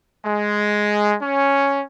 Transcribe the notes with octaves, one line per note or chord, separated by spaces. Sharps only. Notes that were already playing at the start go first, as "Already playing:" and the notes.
G#3
C#4